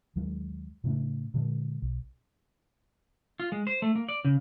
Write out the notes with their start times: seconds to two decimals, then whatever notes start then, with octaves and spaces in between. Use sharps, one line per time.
0.16 D#2 F#3 G#3
0.84 A2 C#3 A3 D4
1.34 A#2 D3 G#3
1.82 B1
3.40 F4
3.52 G#3
3.67 C5
3.82 A3
3.95 A#3
4.09 D5
4.25 C#3